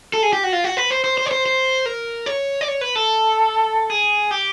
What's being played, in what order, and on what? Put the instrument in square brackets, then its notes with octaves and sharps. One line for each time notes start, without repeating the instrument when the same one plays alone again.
[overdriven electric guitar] A4
G#4
G4
F#4
F4
F#4
B4
C5
C5
C5
C#5
C5
C5
A#4
C#5
D5
C#5
B4
A4
G#4
G4